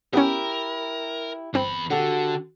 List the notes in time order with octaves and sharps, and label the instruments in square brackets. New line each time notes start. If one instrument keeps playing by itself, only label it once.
[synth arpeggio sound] B3 C#4 [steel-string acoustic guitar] E4 G4 [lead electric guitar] A#4
[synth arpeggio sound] G1 C4 [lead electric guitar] E2 B5
[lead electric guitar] D3 [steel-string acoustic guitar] F#4 G4 A4